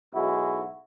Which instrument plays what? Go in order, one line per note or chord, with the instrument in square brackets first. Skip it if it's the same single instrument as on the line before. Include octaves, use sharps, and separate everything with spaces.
[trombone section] B1 G#2 G#3 E4 F#4